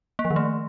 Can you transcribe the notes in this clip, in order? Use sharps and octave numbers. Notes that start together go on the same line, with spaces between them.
A#3
F3
D#3
A3